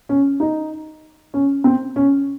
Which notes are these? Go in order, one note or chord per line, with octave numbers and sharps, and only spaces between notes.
C#4
D#4
C#4
C4
C#4